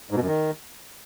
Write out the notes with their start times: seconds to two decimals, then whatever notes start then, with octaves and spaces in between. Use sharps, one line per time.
0.11 G#2
0.16 B2
0.22 F#2
0.27 D#3